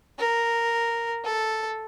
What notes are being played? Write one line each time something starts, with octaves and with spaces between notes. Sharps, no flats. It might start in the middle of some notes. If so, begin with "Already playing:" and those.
A#4
A4